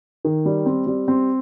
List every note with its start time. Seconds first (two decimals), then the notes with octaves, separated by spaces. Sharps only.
0.25 D#3
0.45 G3
0.66 C4
0.87 G3
1.08 C4